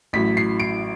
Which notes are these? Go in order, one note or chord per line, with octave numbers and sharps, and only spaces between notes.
A1 A2 F#3 B6
C7
D7